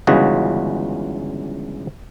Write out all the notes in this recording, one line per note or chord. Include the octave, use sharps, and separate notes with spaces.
G1 C#2 C#3 E3 F#4 D#5